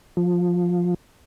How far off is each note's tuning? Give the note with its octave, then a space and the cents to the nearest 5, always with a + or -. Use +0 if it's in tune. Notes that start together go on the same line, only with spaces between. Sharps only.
F3 +15